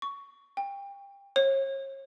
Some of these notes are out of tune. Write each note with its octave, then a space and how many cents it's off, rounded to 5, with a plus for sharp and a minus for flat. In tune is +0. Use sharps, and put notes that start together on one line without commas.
C#6 +15
G5 +25
C#5 -40